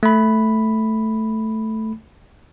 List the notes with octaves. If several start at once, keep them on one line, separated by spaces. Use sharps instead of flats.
A3 B5